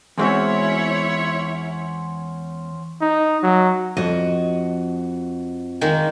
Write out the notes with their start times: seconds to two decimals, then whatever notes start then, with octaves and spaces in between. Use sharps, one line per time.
0.18 E2 G#3 C4 C#4 E4 F#4 C5 C#5
3.01 D#4
3.43 F#3
3.97 F2 F#4 D#5
5.81 D#3 G#3 A#3